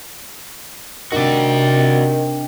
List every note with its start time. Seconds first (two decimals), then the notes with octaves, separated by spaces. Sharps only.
1.12 C3 D#3 D4 F#4 D5 G5